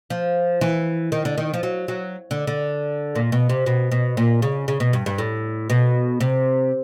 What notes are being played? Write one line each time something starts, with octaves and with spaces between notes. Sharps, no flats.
F3
E3
D#3
D3
D#3
F3
F#3
F#3
D3
D3
A#2
B2
C3
B2
B2
A#2
C#3
C#3
B2
G2
G2
A2
B2
C3